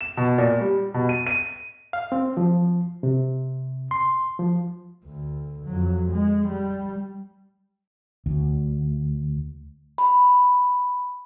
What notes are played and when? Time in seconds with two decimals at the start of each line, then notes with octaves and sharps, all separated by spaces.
0.01 E7
0.17 B2
0.38 A#2
0.60 G3
0.94 B2
1.09 D#7
1.27 D#7
1.93 F5
2.12 C4
2.37 F3
3.03 C3
3.91 C6
4.39 F3
5.05 D2
5.66 F2 F#3
6.11 G#3
6.48 G3
8.26 D2
9.98 B5